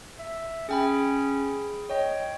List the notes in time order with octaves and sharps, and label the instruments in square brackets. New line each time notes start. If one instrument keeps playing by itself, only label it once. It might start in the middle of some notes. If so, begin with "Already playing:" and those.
[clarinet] E5
[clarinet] C#4 [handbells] G#4 G5 B5
[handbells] C#5 D#5 [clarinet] G5